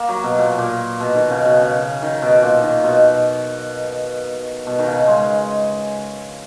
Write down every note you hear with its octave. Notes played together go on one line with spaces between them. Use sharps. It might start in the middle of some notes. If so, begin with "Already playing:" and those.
Already playing: A#3
F#3
B2
A#2
A#2
B2
D#3
C#3
B2
C#3
D#3
B2
A#2
D#3
B2
B2
D#3
C#3
G#3